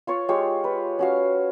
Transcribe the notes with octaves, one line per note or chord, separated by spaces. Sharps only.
F4 C#5 C#6
G#3 F4 G4 C#5
B4
C#4 F#4 F5